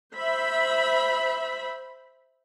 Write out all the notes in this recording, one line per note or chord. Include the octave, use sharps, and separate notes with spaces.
C5 E5 B5